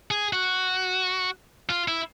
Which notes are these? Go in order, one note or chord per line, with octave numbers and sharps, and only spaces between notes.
G#4
F#4
F4
E4